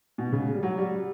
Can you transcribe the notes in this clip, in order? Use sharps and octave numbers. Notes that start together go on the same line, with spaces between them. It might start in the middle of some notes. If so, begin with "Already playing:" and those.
B2
C#3
G3
F#3
G3